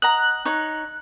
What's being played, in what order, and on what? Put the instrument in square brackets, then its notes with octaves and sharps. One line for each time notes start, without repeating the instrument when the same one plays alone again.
[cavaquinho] D#5 F#5 A#5 [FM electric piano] F#6
[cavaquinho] D#4 C#5